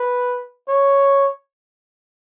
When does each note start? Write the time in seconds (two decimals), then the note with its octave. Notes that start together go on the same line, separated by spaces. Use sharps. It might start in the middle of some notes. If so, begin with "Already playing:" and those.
Already playing: B4
0.69 C#5